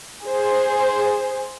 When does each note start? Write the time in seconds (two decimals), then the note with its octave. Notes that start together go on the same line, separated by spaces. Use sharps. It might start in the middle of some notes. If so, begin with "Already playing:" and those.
0.25 G#4 C5